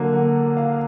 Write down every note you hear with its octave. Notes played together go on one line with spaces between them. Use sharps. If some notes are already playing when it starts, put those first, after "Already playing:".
Already playing: D3 F#3 A#3
F#5
F5